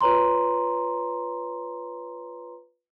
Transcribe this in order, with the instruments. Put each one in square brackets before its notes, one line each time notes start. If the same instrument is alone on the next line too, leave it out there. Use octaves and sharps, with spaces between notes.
[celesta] F4 B4 C#5 A#5 C6